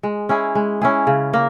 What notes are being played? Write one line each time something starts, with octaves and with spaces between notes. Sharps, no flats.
G#3
C#4 E4 G#4
G#3
C#4 E4 G#4
C#3
A#3